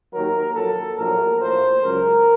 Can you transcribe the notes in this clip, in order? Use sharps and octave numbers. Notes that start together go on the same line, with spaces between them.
D#2 D#3 F#3 A#4
A#1 A#2 F#3 A4
A#1 A2 F#3 A#4
A#1 A2 F3 C5
C#2 C#3 F#3 A#4